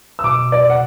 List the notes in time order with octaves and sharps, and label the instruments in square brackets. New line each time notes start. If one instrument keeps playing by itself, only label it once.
[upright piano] E6
[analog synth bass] B2 [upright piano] D6
[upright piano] D5
F#5